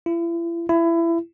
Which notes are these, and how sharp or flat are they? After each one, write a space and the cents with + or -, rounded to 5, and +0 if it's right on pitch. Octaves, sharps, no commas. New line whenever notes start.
E4 +40
E4 +25